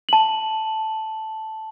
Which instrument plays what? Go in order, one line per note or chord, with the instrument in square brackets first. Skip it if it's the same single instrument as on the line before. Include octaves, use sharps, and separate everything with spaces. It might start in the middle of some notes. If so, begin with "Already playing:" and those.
[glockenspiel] A5 F#7